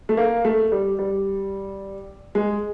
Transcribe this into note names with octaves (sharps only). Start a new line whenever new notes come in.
A3
A#3
A3
G3
G3
G#3